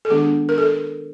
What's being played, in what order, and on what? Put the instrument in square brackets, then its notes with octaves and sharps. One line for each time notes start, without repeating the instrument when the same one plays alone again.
[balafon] A4
D#3 G#3 B3 D4 G#4
A#4
A4